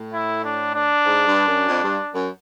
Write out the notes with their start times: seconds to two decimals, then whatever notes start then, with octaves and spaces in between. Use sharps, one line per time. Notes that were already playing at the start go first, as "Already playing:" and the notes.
Already playing: A2
0.13 E4
0.44 D4
0.74 D4
1.06 G#2
1.27 G2
1.47 F#2
1.69 F2
1.84 G2
2.14 F#2